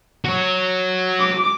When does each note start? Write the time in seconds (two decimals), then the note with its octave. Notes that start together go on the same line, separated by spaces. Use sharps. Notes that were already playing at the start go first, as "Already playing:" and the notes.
0.25 F#4 C#5
1.21 D6